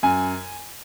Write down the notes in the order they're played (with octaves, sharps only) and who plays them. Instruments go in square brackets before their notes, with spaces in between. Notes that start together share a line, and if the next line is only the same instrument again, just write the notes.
[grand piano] F#2 G#5